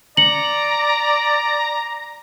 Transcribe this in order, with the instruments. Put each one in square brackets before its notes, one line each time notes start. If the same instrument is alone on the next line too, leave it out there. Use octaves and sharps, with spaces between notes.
[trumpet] D5 [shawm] A#5 [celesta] C#7 F#7